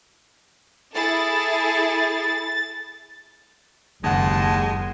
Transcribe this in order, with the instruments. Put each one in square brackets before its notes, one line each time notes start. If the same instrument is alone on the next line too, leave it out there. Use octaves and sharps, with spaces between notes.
[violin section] E4 G#4 A4 [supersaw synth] A6
[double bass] F#1 [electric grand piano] D#2 F#5 [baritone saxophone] G#3 [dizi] A5